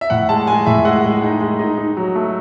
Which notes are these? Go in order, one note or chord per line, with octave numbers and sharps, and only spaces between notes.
E5
A2 F#5
G#3 A5
G#3 G#5
A2 E5
G#3 F#5
G#3
D#4
G#3
D#4
D#4
F#3
A3